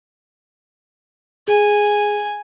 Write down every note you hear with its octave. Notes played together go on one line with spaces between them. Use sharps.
G#4 G#5